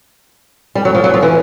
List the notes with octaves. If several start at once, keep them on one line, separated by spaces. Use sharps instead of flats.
G3
F#3
F3
F#3
F3
E3